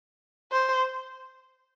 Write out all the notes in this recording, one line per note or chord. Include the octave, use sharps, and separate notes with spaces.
C5